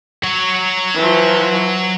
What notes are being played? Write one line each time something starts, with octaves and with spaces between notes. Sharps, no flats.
F#3 C#5
E3 F3